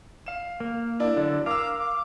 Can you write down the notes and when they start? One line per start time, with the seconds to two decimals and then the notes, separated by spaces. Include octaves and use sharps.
0.26 F5 E7
0.60 A#3
1.00 D4 E4 D5
1.17 D3 F#3 A4
1.46 A#4 F5 D6 E6
1.79 D6